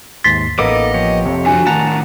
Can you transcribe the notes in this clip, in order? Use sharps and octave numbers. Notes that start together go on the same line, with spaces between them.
D#2 G#2 C6 A6 B6
A1 A#3 B3 D#4 A4 D#5 D6
F3 G4 C#5
F2 C3
D3 F#4 G#5
A2 D#3 F#5 A5 A#5